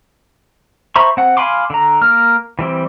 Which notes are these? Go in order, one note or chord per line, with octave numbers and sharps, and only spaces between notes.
C5 E5 A#5 B5 C#6
C4 F#5
F5 G#5 B5 C6 D6
D3 A#5
A#3 A#4 F6
E3 G3 C4